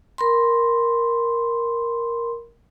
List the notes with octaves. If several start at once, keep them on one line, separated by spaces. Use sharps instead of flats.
A#4 B5 C6